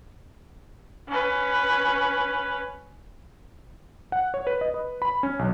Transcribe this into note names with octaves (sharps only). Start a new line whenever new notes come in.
C#4 B4
F#5
C#5
B4
D#5
B4
B5
C#4
B1